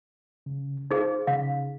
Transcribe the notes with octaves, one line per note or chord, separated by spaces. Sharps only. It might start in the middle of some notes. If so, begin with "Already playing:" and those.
C#3
D#4 G#4 C5 F5
C#3 F5